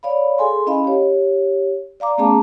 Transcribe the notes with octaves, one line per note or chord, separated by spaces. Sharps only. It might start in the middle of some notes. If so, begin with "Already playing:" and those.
C#5 D5 F5 B5
G#4 A4 G#5 C6
C#4 E4 D#5 F5 B5
G4 C#5
D5 F5 A#5 D6
A3 B3 C#4 G#4 A5 A#5